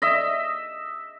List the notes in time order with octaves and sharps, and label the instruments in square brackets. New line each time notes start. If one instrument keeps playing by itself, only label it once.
[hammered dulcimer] D#5 E5